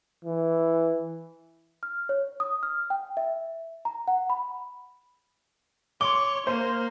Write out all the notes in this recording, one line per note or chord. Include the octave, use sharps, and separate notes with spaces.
E3
F6
C#5
D#6
F6
G5
E5
A#5
F#5
B5
C#5 C6 D6 G7
A#3 C5